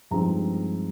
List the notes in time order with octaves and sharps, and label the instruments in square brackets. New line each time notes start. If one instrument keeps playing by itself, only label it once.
[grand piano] G2 F3 G#3 C4 D#4 A#5